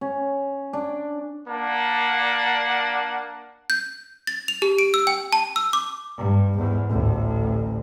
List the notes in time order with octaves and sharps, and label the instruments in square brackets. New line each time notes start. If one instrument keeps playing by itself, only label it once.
[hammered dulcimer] C#4
D4
[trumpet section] A#3 D4 D5 F#5 A5
[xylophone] G6
A6
F7
G4
D7
E6
G5
A5
E6
D6
[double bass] G2
E2 G#2
A1 D2